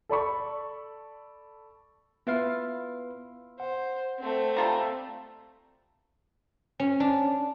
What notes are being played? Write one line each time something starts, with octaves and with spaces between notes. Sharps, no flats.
A4 D5 B5 C#6
B3 E4 F4 B4 F5
C5 F#5
A3 C4
G3 F4 A4 D5 A#5
C#4
D4